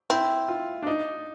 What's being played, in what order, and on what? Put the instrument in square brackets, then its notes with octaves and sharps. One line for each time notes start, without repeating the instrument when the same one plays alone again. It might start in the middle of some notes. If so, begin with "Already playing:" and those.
[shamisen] C4 [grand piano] E4
[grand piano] F4
D4
D#4